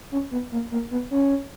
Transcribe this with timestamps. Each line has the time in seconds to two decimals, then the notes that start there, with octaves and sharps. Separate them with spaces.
0.12 C#4
0.31 B3
0.52 A#3
0.71 A#3
0.91 B3
1.11 C#4